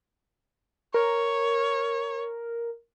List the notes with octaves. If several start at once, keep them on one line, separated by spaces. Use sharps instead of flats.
A#4 C#5